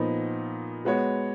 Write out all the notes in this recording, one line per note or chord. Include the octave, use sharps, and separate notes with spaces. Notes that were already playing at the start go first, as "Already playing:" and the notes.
Already playing: A#2 F3 B3 D#4
G#3 B3 F#4 C#5